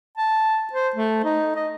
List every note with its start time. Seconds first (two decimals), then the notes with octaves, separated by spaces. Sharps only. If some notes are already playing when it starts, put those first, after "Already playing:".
0.18 A5
0.73 C5
0.96 A3
1.24 D#4
1.56 D#5